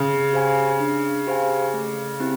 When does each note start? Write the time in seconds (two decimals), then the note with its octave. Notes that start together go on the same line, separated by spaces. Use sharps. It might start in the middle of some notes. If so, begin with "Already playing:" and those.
Already playing: C#3
0.33 G4 C5 F5 G#5
0.80 D4
1.27 G4 C5 F5 G#5
1.73 A3
2.20 C4 E4 G4